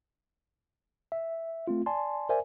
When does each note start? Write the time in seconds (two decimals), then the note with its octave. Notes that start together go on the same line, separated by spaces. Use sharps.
1.12 E5
1.67 A3 C4 F4
1.86 D5 G#5 A5 C6
2.29 A#4 C5 D5 E5 G#5